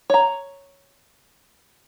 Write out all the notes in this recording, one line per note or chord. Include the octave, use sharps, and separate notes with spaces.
C#5 A#5